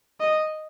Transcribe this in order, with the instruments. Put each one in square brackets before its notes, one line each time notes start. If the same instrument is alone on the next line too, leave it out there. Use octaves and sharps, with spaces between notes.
[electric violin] D#5